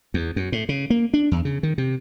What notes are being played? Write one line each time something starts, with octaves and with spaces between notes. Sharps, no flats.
E2
F#2
A2
C#3
A#3
D4
E2
C#3
D#3
C3